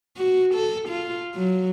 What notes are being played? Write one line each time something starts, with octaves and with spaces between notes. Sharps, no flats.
F#4
A4
F4
F#3